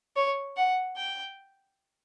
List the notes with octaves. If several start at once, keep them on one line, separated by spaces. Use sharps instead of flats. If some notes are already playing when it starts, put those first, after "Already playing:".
C#5
F#5
G5